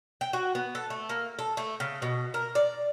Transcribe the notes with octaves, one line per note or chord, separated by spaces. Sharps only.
G5
F#4
B3
A4
A3
A#3
A4
A3
C#3
B2
A#4
D5